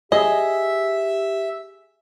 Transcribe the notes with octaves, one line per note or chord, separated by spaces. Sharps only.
G4 G#4 D#5 E5